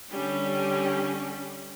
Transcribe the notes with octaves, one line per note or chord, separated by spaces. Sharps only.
D3 G3 C#4 G4